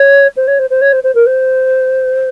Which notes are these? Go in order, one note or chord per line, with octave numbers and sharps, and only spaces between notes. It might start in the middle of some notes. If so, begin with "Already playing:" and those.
Already playing: C#5
C5
C#5
C5
C5
C#5
C5
C5
A#4
C5